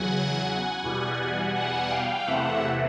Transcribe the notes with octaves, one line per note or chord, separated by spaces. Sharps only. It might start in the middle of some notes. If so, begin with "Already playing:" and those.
Already playing: E2 C#3 F#3 F#5 G#5
E2 B2 G3
F#5 G#5
F5 G5
E2 C3 E3 A3 E5 F#5